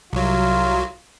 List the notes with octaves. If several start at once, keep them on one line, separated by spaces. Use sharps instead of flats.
C2 F#3 F4